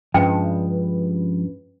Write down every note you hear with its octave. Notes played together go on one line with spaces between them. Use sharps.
G2 F3 G#3 C#4 B4 G5